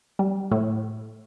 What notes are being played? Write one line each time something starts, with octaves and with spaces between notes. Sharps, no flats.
G3
A2